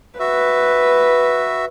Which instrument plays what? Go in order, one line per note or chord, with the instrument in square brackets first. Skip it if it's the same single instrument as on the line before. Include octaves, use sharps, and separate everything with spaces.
[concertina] F#4 E5 [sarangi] B4